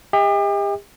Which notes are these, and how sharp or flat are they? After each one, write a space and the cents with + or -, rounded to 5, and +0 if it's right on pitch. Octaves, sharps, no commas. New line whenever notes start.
G4 +40 D#5 +45